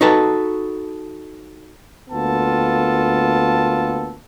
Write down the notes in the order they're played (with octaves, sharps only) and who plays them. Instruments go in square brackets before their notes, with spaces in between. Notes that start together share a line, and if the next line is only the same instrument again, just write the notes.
[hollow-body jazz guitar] D#4 F#4 A4 B4 A5 A#5
[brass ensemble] D2 A#3 B3 F4 A4 A5